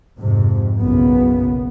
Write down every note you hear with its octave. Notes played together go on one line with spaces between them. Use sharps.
F2 G#2 C3
F#1 B1 C#3 B3